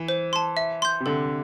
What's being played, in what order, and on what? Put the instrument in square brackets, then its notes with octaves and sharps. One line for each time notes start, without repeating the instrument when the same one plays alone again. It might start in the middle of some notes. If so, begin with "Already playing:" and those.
Already playing: [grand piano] E3
[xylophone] C5
A5 C6
E5
C6 G6
[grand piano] C3
[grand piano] D3 [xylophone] A4